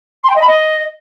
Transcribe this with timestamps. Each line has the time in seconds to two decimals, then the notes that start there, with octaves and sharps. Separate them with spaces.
0.23 C6
0.29 G5
0.35 D#5
0.41 B5
0.47 D#5